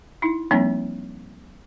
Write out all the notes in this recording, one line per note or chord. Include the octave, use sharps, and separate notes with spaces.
D#4 E4
F3 G3 A#3 C4 D4 D#4